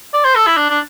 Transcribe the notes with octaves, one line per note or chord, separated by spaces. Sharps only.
D5
C5
A4
E4
D4
D4